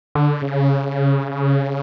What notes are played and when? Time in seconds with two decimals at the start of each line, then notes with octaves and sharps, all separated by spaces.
0.15 D3
0.42 C#3